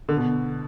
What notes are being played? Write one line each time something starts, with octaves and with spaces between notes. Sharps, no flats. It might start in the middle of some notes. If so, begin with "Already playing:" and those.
D3
B2